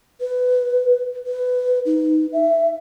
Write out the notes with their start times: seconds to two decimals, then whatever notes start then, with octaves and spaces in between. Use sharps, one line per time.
0.21 B4
1.27 B4
1.86 D#4
2.33 E5